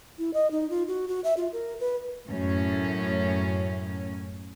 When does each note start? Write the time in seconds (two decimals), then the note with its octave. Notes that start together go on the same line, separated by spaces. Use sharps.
0.19 E4
0.34 D#5
0.51 D#4
0.70 F4
0.88 F#4
1.08 F#4
1.24 E5
1.37 F4
1.53 A#4
1.80 B4
2.28 F#2 A2 C#4